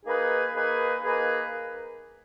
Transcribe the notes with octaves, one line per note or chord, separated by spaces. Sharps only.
A#3 D#4 G#4 B4
A#3 D#4 G#4 B4
A#3 D#4 G#4 B4